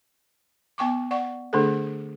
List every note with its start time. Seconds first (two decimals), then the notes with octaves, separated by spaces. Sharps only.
0.78 B3 G5 C#6 D6
1.11 D5 F#5 C#6
1.53 D3 A3 D4 G#4 A4